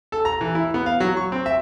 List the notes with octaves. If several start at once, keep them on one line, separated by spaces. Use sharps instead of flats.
A4
A#5
E3
E4
B3
F5
F#3
C#6
C4
E5